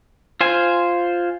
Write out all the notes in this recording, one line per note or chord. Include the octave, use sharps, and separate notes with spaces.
F4 C5 G#5